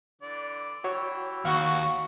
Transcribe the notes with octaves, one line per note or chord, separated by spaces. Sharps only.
D3 E3 D5
E3 F#4 G4 C#5 E6
D#2 F#4 F5 F#5 C#6